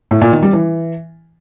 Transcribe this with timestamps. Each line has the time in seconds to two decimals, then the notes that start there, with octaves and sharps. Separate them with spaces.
0.11 A2
0.21 A#2
0.32 D#3
0.43 G3
0.53 E3